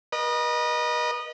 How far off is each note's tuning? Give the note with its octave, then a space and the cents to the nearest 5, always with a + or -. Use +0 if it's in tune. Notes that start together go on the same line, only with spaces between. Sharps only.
B4 -40 D#5 -20